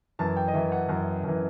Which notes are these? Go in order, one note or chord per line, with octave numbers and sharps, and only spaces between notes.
F#2 E3 A5
G5
D#5
F#2 E3 E5
F#5
F#2 E3 F#5
F#2 E3